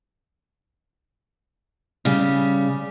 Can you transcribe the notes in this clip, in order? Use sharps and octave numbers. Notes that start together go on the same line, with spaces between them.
C#3 G3